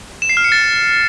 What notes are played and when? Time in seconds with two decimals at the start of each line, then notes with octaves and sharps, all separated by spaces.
0.22 E7
0.29 C7
0.37 F6
0.44 C#7
0.52 A6